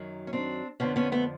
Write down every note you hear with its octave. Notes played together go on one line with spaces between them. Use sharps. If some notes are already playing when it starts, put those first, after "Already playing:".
Already playing: F#2 D#3 F#3
C#4
C4 D4
F2 D3 F3 B3 C#4
B3 C#4
A3 B3